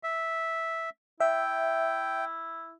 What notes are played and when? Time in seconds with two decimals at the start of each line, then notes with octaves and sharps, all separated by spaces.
0.03 E5
1.20 E4 E5 G5